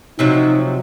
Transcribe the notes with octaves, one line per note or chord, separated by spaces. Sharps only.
C3 F3 F#3 D#4